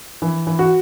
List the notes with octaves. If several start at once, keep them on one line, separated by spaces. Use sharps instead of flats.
E3
E3
F#4